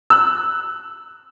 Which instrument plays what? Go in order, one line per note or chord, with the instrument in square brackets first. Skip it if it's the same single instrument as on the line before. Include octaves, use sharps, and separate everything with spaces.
[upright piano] E6 F#6